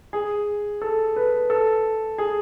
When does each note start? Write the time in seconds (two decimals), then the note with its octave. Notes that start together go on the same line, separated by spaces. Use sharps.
0.13 G#4
0.82 A4
1.16 B4
1.50 A4
2.18 G#4